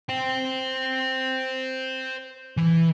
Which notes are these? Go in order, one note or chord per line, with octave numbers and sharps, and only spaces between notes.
C5 G5
E3